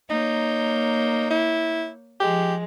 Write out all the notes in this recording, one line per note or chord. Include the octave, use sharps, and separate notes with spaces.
A#3 D#4 C#5 G6
E4
F3 G#3 G4